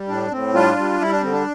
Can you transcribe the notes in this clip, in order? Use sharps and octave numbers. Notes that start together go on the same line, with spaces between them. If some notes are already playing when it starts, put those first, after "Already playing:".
Already playing: G3
A2 D4
A2 C4
G3 D4 F4
G3
G3 E4
D4
D3 C4
D4